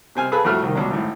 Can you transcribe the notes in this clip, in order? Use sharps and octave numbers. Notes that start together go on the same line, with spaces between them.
C3 C4 G#5 F6
G#4 A4 B4 F5 B5
F2 A2 A3 F#4 F6
C2 D#3
C#2 B2 D4
G#1 A2